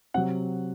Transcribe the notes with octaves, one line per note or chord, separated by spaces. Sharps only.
C3 F#3 F#5